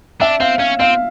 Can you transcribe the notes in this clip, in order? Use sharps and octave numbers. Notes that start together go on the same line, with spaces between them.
D4 E5
C4 F5
C#4 F5
C4 F5